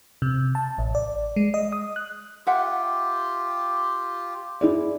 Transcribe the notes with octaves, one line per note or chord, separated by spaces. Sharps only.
C3
A5
A1
D5
G#3
D#5
D#6
F#6
F4 G4 E5 F#5 G5
E4 G#4 D5